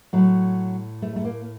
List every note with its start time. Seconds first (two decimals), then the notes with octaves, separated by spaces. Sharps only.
0.13 A2 F#3
1.02 A3
1.16 A3
1.25 A#3